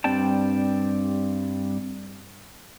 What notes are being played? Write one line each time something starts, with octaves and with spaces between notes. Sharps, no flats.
G2 G3 C4 D5 G5 A5